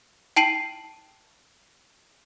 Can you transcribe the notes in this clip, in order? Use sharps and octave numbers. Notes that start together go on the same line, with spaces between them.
G5 A5 C7 D#7 F#7